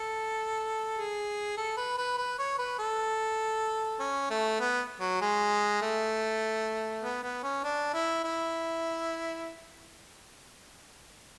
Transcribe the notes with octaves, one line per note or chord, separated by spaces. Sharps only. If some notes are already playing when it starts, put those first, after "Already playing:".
Already playing: A4
G#4
A4
B4
B4
B4
C#5
B4
A4
C#4
A3
B3
F#3
G#3
A3
B3
B3
C#4
D4
E4
E4